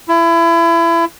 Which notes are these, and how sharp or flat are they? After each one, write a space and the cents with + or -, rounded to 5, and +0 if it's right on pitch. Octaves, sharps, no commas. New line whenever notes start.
E4 +30